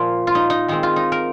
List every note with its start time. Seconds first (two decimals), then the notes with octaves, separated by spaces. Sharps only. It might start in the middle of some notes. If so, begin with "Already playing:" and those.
Already playing: A#2 F3 A#3 F4
0.27 F4
0.35 D#4
0.50 D#4
0.68 D#3 G#3 C4 D#4
0.83 F4
0.96 D#4
1.12 A#4